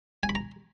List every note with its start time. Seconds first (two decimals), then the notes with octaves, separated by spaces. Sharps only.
0.23 G#5
0.29 B5
0.35 A#5